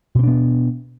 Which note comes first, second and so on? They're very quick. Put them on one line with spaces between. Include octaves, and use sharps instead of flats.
B2 C4 D4 B3